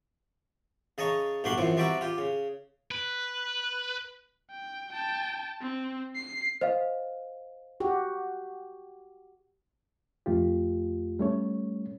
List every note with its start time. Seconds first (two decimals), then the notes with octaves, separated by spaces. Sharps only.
0.98 C#3 D#5 A5 A#5 C#6
1.44 B1 G2 D4 F#4 B5 C6
1.58 F#2 E3 F3 C4
1.77 G3 C4 F#4 D5 E5 A#5
2.01 F4 G4
2.18 C#3
2.91 B4
4.51 G5
4.93 G5 A5
5.61 C4
6.16 C7
6.61 C5 D#5 F5
7.80 F#4 G4
10.26 F2 A3 F4 G4
11.19 G3 A3 C#4 C#5